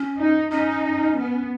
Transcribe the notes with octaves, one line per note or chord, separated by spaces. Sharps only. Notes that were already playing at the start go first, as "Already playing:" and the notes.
Already playing: C#4
D#4
C#4 D#4
B3